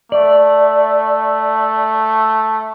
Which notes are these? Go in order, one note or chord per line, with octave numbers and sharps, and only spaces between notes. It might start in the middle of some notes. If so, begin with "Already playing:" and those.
A3 D5